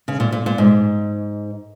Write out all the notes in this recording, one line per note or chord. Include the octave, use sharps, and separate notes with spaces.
C#3
A#2
A#2
A#2
G#2